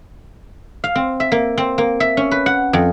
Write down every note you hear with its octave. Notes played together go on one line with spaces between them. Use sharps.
F5
C4
E5
A#3
C4
A#3
E5
C#4
B4
F#5
F2